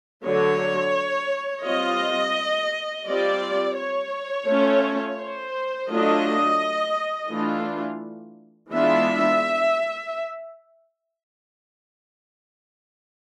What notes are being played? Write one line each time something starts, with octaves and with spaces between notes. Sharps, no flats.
D3 F#3 A3 C#5
G3 C4 F4 D#5
G3 C4 F4 D5
C#5
A3 C#4 F4
C5
F#3 A3 D4 F4 D#5
E3 A3 D4 F4
E3 G#3 B3 D4 F4 E5